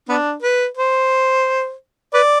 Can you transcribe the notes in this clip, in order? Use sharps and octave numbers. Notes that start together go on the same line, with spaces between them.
B3 D4
B4
C5
B4 D5